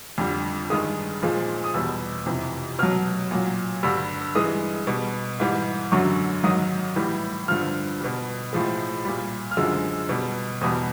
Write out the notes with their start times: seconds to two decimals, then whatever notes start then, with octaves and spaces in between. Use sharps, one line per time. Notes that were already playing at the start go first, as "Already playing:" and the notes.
0.18 F2 D3 G3
0.70 G2 D#3 G#3 D#6
1.22 A#2 F3 G#3
1.64 D#6
1.74 E2 B2 G3 E6
2.26 F2 C3 E3
2.79 B2 F#3 F6
3.31 A#2 F#3
3.83 G2 D3 G3 E6
4.35 G2 E3 G#3 D#6
4.87 B2 G3
5.40 G#2 E3 G3
5.92 F#2 D3 F#3 C#6
6.44 G#2 D#3 F#3 D#6
6.96 A2 E3 G3
7.48 G2 D3 F3 F6
8.01 B2 G3
8.53 A2 F3 G#3
9.05 A#2 G3
9.51 F6
9.57 F#2 D3 F3 G#3 E6
10.09 B2 G3
10.61 E2 B2 G3 D#6